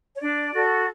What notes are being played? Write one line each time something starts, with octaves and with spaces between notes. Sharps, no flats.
C#5
D4 D5
F#4 A4